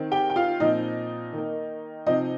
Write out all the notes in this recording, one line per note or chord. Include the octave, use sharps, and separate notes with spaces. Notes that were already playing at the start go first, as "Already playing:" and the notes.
Already playing: D#3 C4
G4 G5
G5
F4 F5
A#2 F3 C4 D#4 D#5
D#3 A#3
C3 F3 C4 D#4 D#5